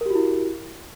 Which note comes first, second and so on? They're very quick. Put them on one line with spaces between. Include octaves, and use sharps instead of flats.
A#4 G4 F#4 E4